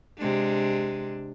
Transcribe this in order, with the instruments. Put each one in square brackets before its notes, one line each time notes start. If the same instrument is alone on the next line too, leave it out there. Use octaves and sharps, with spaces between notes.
[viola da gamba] C3 G#3 D4